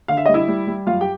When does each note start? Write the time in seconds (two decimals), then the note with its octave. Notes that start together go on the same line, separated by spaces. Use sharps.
0.08 D3 F5
0.17 E5
0.26 G3 D#5
0.34 E4 E5
0.48 G3
0.67 G3
0.87 F#2 F4 F5
1.01 G4 G5